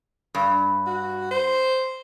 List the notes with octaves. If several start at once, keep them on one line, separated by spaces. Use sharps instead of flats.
G2
F#4
C5